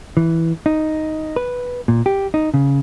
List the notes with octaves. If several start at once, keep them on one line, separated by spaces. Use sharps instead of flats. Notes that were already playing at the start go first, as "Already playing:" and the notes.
E3
D#4
B4
A#2
G4
D#4
C#3